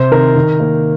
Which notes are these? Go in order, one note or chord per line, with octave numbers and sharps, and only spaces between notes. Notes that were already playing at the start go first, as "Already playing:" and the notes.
Already playing: C3 C5
D#3 C4 A#4
D#3
A#3